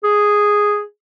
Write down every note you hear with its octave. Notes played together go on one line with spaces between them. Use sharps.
G#4